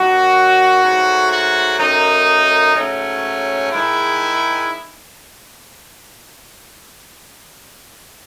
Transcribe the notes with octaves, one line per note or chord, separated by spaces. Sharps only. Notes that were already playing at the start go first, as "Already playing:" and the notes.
Already playing: F#2 D#3 F#3 F#4
G#2 F#3 A3
F#4
F#2 D#3 A3 D#4
G#2 F#3 A3 C#4
G#2 D#3 G#3 E4